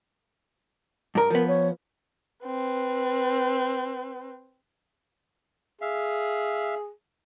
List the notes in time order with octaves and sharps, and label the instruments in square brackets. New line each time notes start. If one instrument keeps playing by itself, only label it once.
[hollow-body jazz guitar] G2 A#4
[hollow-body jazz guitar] F3 B3 [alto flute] A#4
[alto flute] C#5
[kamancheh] C4 B4
[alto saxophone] G#4 [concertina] E5 F5